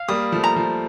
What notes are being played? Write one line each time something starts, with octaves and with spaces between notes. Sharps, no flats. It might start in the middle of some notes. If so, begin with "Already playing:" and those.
Already playing: F5
G3 A#3 D#6
F3 A3
A#5
F3